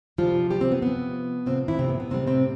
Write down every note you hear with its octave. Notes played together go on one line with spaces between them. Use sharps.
C3 E3 F3 G3 F4
G3 G4
C3 C4
B3
C3 F3 B3
A2 C3 F3 C4
E3 E4
C3 C4
B3
B3
A2 C3 G3 C4
C3 C4